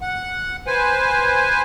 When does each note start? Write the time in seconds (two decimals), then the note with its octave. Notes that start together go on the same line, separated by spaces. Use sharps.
0.01 F#5
0.67 B4 C5 G#5